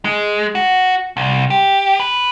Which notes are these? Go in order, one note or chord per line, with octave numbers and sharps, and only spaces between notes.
G#3
F#4
C2
G4
B4